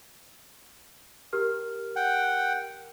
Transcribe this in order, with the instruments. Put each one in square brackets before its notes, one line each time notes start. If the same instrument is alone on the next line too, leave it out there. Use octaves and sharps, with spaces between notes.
[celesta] G4 A#4 F6
[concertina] F#5 G5